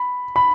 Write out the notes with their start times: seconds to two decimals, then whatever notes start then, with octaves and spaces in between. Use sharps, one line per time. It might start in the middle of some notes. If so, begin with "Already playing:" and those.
Already playing: B5
0.36 B5